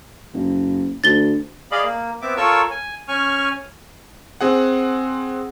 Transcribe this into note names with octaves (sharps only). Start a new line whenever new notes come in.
F#1
D2 A6 G7
G#4 D5 D#5 F5 B5
A#3
B3 C4 E5 D6
F4 A4 A#4 C#5 C#6 E6
G#5
C#4 G#5 C#6 F6
C4 G#4 F#5